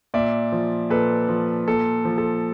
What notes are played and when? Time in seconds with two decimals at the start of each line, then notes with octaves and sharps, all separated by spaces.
0.14 A#2 D5 E5
0.52 F3
0.90 A#2 A4 B4
1.28 F3
1.68 A#2 A4
2.05 F3
2.18 A4